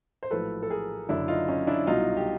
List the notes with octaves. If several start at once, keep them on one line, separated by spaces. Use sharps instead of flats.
C5
A#1 A2 F#3 A4 B4
A4
G#4 A#4
F#1 F#2 D3 D4 E4
D#4 F4
C#4 D#4
D4 E4
C2 B2 F#3 D#4 F4
G4